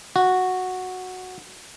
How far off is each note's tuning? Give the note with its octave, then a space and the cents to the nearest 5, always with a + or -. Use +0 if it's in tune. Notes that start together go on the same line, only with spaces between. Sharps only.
F#4 -5